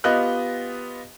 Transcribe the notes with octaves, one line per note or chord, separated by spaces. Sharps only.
B3 F4 G4 D#5 F#6